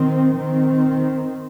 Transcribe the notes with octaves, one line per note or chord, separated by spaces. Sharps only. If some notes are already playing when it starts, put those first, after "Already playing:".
Already playing: D#3 C4
D#3 C4